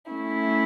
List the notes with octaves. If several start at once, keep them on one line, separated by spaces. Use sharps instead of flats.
A3 C#4 E4